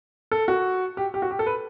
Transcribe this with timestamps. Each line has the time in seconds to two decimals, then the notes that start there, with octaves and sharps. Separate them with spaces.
0.31 A4
0.48 F#4
0.97 G4
1.14 G4
1.22 F#4
1.31 G4
1.39 A4
1.47 B4